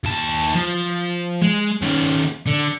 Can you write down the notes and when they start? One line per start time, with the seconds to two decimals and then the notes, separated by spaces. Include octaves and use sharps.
0.04 D#2 A5
0.55 F3
1.42 G#3
1.82 D#3 C#4
2.46 D3